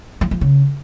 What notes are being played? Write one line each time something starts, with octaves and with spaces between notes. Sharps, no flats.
F3
F3
C#3